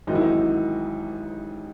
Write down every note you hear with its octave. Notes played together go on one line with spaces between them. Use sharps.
A1 G#2 D#3 F#3 D#4
E4
D#4